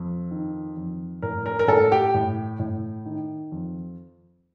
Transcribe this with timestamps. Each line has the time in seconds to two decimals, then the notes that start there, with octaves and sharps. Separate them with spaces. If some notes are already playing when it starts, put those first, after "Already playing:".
Already playing: F2
0.31 D#3
0.77 F2
1.22 A2 A#4
1.46 A#4
1.59 A#4
1.68 A2 A4
1.92 G4
2.14 A2
2.59 A2
3.05 D#3
3.52 F2